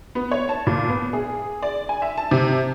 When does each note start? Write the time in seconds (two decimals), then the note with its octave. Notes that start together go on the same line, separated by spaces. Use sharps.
0.15 B3
0.31 C#5
0.49 A5
0.67 A#2
0.89 B3
1.13 G#4
1.63 D5
1.89 G#5
2.02 E5
2.18 A5
2.31 C3